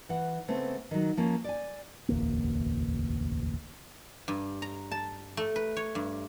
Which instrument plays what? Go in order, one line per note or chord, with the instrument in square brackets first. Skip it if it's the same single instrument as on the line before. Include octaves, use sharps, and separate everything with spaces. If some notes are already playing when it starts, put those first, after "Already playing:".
[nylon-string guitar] E3 F#5
C#3 A3 B3 C4
D#3 F#3
F3 A#3 C#4
D5 G#5
[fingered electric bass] E1 A1 D2 A#3
[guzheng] G2
A#5
A5
A3
B4
C#5
G2